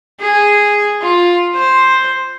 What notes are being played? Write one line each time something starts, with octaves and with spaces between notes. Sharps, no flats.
G#4
F4
C5